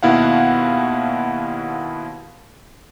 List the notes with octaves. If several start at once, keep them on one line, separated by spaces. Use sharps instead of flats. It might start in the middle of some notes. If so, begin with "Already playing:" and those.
D#2 B2 E4 F5 F#5